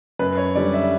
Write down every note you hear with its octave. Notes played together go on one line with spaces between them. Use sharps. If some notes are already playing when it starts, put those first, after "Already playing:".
F#2 B4
C#5
D3 G3 D5
E5